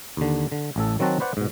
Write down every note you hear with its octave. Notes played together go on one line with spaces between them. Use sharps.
D#2 D3
D3
A1 A2 A4
D#3 F#3 C4 F#4 A5
B4 C5 D5 F#5
G#2 B2